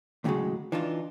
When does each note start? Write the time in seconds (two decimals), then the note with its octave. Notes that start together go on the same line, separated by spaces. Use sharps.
0.24 D#2 A2 C#3 F3 F#3 G#3
0.72 E3 D4 D#4 F4